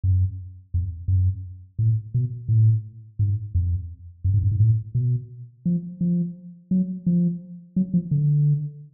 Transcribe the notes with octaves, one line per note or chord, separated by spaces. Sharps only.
F#2
F2
F#2
A2
B2
A2
G#2
F2
F#2
G#2
F#2
G#2
A2
B2
F3
F3
F#3
F3
F#3
F3
D3